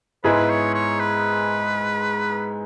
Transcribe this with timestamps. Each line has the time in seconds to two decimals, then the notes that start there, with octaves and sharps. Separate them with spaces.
0.24 G#2 G#3 B3 E4 G#4 B4
0.50 C#5
0.74 C#5
1.00 B4